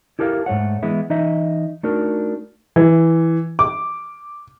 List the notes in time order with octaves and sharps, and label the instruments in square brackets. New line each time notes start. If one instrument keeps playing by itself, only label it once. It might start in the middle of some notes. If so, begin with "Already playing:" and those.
[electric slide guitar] E4 G4 A4 A#4 D5 F5
G#2 A3 C#5 F#5
E3 G#3 B3 E4
E3 D#4 D#5 E5
A3 D4 D#4 F#4 A#4
[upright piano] E3
D6